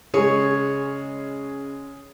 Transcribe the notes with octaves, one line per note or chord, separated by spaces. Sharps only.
C#3 G#3 G#4 C#5